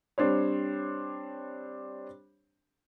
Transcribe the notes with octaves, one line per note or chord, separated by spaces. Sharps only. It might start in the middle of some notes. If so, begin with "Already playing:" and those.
G3 C4 D4 C5 C#5